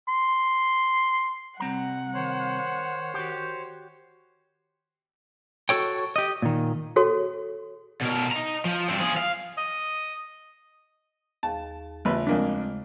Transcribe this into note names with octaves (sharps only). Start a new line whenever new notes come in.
C6
C2 G3 C4 F#5 A#5
D#3 C5 C#5
F#4 G4
F#4 A4 C#5 G5
G4 D#5
A#2 D#3
F#4 G#4 A4 C#5
B2 A#4
D#5 A#5
F3
G2 C4
F3 G#4
F5
D#5
D#2 G#4 F5 A5
A1 C#3 A3 F4 B4
F2 G#3 A#3 D4